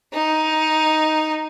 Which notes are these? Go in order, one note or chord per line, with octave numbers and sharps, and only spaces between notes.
D#4